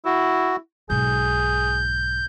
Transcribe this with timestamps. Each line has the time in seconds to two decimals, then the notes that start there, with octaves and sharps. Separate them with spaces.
0.05 E4 F#4
0.90 B1 G#2 G#4 G6